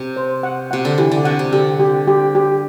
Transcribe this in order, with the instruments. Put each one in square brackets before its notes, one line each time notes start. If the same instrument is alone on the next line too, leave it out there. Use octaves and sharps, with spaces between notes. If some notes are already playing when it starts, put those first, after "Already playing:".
Already playing: [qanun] C3
[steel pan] C5
F#5
[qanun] C3 [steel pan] F#5
[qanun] D3
[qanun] E3 [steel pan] G4
[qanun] D3
[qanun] C3 [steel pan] F#5
[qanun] C3
[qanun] D3 [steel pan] G4
[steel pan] G4
G4
G4